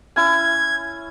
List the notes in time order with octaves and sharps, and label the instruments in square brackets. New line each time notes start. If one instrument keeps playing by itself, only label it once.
[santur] C#4 E4 [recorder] G#6